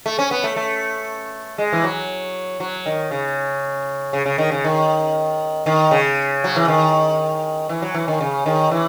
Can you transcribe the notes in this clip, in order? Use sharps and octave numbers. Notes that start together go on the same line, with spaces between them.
A3
C#4
B3
A3
A3
G#3
E3
F#3
F#3
D#3
C#3
C#3
C#3
D#3
C#3
D#3
D#3
C#3
F#3
E3
D#3
E3
F#3
E3
D#3
C#3
D#3
E3